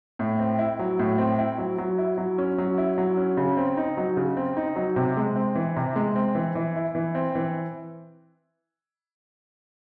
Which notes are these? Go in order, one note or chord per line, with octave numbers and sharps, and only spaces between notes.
A2
C4
E4
F#3
A2
C4
E4
F#3
F#3
E4
F#3
C#4
F#3
E4
F#3
C#4
C#3
C4
D#4
F#3
C#3
C4
D#4
F#3
C3
G#3
C4
E3
C3
G#3
C4
E3
E3
E4
E3
C4
E3